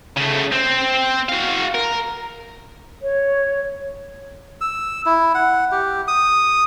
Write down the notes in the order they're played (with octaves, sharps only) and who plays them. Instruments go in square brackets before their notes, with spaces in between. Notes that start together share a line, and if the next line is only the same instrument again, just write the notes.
[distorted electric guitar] C#3 A3
C4
F#4 F5
A#4
[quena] C#5
[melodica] E6
E4
F#5
G4
D#6